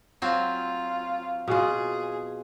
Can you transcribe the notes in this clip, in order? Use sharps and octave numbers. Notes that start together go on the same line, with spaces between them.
F#3 C4 F4
B2 F4 G#4